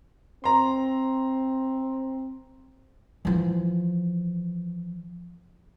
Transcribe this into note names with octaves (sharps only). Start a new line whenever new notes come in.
C4 A#5 C6
E3 F3